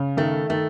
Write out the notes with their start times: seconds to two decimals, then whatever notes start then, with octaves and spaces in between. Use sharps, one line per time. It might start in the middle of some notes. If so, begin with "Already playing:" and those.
Already playing: C#3
0.17 D#3 A3
0.50 D#3 A3